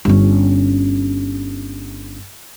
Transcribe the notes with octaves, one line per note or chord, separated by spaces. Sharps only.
G1 C#4